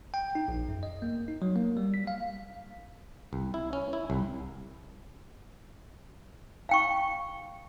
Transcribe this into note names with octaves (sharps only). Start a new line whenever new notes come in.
G5
D#4
A#1
F#2
D#5
A#3
D#4
F#3
A#3
G3
B6
F5
C2
E4
C#4
E4
C2
F5 G5 C#6